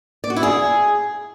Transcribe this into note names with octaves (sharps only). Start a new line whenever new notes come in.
D5
F#4
E4
G#4